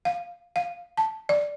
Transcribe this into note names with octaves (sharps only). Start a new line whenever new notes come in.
F5
F5
A5
D5